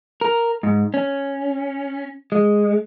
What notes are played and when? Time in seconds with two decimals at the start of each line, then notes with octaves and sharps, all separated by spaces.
0.21 A#4
0.63 G#2
0.94 C#4
2.32 G#3